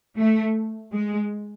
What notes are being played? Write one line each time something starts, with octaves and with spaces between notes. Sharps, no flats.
A3
G#3